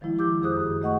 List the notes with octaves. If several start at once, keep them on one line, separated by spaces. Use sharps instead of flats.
D#3 F3 G#3 E4
G4 D6 E6 G6
F2 D#3 G#4 C5 D#6 F#6
F#2
A3 D#5 F#5 C#6